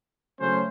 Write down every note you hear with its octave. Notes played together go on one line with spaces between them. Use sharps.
C#3 F#3 A3 C#4 C5